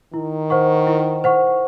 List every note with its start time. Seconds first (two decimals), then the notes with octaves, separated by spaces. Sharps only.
0.13 D#3 E4
0.50 C5 F#5 C#6
0.87 E4
1.24 C5 F#5 C#6